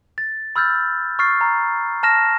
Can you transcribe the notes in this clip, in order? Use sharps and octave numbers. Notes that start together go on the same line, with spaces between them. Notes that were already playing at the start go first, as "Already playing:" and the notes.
A6
B5 E6 F6 G6 A6
C#6 F6 A6 C7
A#5
A5 F6 A#6 E7